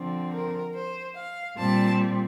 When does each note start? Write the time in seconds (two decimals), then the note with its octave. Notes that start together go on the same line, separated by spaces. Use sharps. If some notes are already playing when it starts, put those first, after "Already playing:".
Already playing: D3 F3 C4
0.33 A#4
0.75 C5
1.16 F5
1.57 A#2 G3 C4 A5